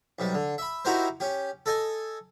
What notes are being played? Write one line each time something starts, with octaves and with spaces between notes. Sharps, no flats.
B1 C3 G3
D3
E5 B5
D#4 E4 F#4 G4 A#4 C5
C#4 G4
A4 D#5 G#5